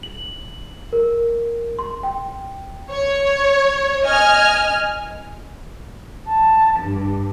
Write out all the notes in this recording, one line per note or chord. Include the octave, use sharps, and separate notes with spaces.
F#7
A#4
C6
G5
C#5
D#5 G#5 F6
A5
G2